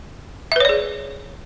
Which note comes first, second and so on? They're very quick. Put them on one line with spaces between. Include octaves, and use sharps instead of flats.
E5 B4 C#5 D5 G#4